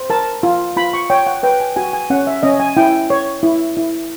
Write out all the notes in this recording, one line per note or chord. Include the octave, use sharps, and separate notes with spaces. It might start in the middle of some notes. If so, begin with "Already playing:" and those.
Already playing: C5
A#4 A5
F4
F4 B5
C#6
C#5 G5
F#5
B4 G5
G#5
F#4 G#5
G#5
C#4 F#5
E5
C#4 D#5
G#5
E4 G5
C#5
E4
E4